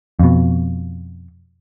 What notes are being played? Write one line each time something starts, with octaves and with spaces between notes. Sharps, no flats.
F2 B2